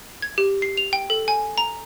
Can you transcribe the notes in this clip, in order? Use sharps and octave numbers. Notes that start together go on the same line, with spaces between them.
G#6
G4
C7
F7
G5
A4
G#5
A#5